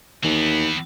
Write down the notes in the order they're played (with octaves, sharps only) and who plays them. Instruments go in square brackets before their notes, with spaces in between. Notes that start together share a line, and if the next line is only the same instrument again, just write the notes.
[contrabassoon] D#2 [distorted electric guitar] E3 B3